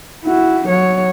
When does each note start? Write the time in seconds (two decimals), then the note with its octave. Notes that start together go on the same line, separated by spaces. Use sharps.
0.24 E4 F#4
0.68 F#3 C#5